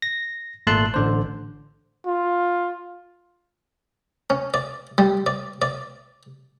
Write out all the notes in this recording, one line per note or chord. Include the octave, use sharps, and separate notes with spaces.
A#6
G#1 A#2 A3 A5 C6 F#6
A1 D3 C5
F4
C#4
D5
G3
D5
D5